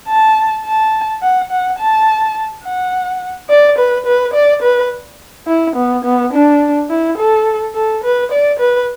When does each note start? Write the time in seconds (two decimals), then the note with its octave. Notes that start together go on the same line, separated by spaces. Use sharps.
0.08 A5
0.65 A5
1.22 F#5
1.51 F#5
1.79 A5
2.64 F#5
3.49 D5
3.78 B4
4.06 B4
4.34 D5
4.62 B4
5.48 E4
5.76 B3
6.04 B3
6.33 D4
6.90 E4
7.18 A4
7.75 A4
8.04 B4
8.32 D5
8.59 B4